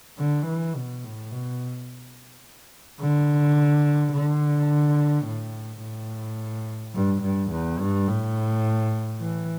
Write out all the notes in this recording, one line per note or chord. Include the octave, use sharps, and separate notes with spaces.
D3
E3
B2
A2
B2
D3
D3
A2
A2
G2
G2
E2
G2
A2
E3